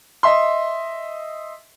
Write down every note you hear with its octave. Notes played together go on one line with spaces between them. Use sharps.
D#5 E5 C6